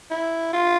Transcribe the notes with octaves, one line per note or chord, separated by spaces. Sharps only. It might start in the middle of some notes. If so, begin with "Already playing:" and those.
E4
F4